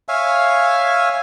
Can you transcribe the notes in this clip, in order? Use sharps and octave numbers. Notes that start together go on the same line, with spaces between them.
C#5 E5 F5 G#5